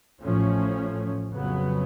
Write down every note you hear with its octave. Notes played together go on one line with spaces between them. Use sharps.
A1 A2 F3 A3 C#4
F2 C#3 F#3 B3